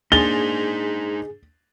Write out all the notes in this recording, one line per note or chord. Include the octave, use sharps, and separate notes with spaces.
A#3 D4 D#4 G#4 C5 A6 G7